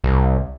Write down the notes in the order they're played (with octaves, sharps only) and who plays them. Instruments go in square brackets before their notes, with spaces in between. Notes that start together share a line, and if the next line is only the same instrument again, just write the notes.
[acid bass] C2